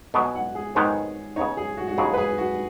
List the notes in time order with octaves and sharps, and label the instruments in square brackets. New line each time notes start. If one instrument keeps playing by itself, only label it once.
[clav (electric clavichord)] B2 F#3 B3 [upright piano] G#5
[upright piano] F#5
G#4
[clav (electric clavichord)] G#2 D#3 G#3 B3 [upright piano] C#5
[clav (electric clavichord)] C#3 B3 D#4 [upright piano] C#5
[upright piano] G#4
F#4
F#4
[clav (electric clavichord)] D#2 C#3 F#3 [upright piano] G#4
[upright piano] B4
G#4
F#4